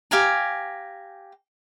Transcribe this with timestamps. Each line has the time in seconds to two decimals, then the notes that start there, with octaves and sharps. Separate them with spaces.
0.11 G4 F5 G#5 A#5